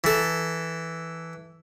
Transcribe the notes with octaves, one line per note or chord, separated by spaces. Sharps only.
E3 A4